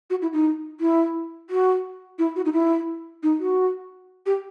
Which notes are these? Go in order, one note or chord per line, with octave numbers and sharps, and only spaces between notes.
F#4
E4
D#4
E4
F#4
E4
F#4
D#4
E4
D#4
F#4
G4